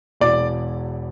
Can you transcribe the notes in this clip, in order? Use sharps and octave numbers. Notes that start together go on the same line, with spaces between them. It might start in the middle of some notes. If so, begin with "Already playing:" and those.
E1 E2 E3 D5